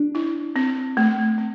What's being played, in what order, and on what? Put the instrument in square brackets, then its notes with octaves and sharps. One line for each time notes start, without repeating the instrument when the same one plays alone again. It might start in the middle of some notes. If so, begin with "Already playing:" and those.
Already playing: [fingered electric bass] D4
[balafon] E4
C4
A3
C4